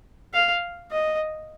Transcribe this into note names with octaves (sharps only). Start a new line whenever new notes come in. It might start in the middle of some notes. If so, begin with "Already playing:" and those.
F5
D#5